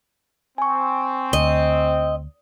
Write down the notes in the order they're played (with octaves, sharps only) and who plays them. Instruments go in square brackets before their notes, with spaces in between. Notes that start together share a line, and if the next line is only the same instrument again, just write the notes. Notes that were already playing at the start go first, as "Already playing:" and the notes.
[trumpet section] C4 [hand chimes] G#5 C#6
[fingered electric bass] D2 [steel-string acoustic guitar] D#5